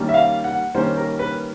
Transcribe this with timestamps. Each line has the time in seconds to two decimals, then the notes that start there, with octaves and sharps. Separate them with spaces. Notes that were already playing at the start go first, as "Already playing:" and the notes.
Already playing: D#3 G3 A#3 C#4
0.09 E5
0.14 F5
0.44 F#5
0.75 D#3 G3 A#3 C#4 C5
0.97 A#4
1.19 B4